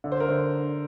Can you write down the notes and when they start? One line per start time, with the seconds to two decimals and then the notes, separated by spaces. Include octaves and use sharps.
0.04 D3
0.12 C5
0.20 A#4
0.29 D3 C5